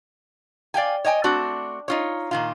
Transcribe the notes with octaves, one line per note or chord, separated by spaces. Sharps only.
D5 F5 G5 G#5
C#5 D#5 G5 G#5
A3 C4 D4 F#4
D#4 F4 C#5
A#2 D#3 F4